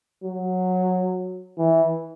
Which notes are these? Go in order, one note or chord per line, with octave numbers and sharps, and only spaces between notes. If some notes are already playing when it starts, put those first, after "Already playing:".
F#3
E3